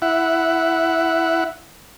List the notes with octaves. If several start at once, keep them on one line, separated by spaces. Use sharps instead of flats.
E4 F#5